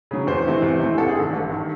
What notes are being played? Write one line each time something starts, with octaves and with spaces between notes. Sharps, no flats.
C#3 F#3
E2 C5
C3 E3 A3
E2
C3 E3 A3
A1 A4
G#4
G2 D#3 A4
A1
G2 D#3